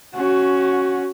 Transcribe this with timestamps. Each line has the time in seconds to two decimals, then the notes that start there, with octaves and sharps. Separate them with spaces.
0.15 C#4 F#4